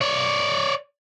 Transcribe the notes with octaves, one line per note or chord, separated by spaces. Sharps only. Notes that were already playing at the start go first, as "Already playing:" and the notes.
C#5 D5